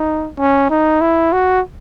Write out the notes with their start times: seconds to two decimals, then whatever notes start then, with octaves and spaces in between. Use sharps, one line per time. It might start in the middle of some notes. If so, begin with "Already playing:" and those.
Already playing: D#4
0.38 C#4
0.70 D#4
1.01 E4
1.33 F#4